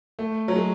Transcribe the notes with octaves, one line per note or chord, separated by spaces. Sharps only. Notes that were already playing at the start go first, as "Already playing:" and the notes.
A3
F#3
G#3